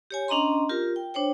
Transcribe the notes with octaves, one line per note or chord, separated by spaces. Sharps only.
G4 C#5 G#5
C#4 D4 D#5 A#5 C6
F4 G4 A#4
G5
D4 C5 C#5 G5